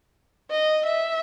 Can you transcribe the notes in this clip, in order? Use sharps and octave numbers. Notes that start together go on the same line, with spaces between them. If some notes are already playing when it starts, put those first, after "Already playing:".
D#5
E5